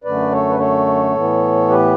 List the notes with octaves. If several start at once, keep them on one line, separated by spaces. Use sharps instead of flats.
F#2 D3 A3 B4 D5
A4 C#5
B4
A4 C#5
A2 E3 B3
G4 B4